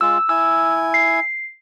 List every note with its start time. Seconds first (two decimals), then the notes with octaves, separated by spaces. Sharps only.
0.01 G#3 F4 E6
0.29 E4 G#5 E6
0.94 C7